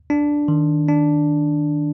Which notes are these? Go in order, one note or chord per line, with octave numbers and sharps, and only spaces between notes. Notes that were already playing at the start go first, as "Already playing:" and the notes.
D4
D#3
D4